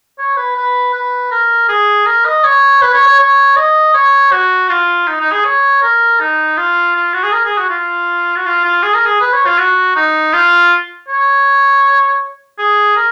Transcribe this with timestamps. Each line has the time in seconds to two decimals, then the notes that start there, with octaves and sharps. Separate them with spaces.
0.18 C#5
0.37 B4
0.56 B4
0.93 B4
1.31 A#4
1.69 G#4
2.06 A#4
2.25 D#5
2.44 C#5
2.82 B4
2.94 C#5
3.07 C#5
3.19 C#5
3.56 D#5
3.94 C#5
4.32 F#4
4.69 F4
5.07 D#4
5.20 D#4
5.32 G#4
5.45 C#5
5.82 A#4
6.20 D#4
6.57 F4
6.95 F4
7.14 F#4
7.23 G#4
7.32 A#4
7.45 G#4
7.57 F#4
7.70 F4
8.36 F#4
8.46 F4
8.65 F4
8.83 G#4
8.94 A#4
9.05 G#4
9.21 B4
9.33 C#5
9.46 F4
9.58 F#4
9.96 D#4
10.33 F4
11.08 C#5
12.58 G#4
12.96 A#4